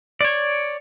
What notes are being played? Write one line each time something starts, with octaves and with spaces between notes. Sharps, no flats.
C#5 D5